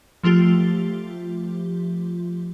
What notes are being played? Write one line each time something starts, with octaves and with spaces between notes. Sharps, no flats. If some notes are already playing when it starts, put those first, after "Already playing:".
F3 A3 F4 G4